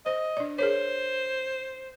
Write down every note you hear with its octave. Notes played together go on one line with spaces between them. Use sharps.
C5 D#5
D4 D5
G#4 A#4 C5 C#5